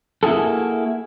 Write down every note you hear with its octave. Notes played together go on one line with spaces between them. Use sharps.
A#3 E4 F#4 G#4 A4